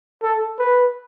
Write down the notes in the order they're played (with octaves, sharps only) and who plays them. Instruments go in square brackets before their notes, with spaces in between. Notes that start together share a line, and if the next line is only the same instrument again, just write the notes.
[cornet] A4
B4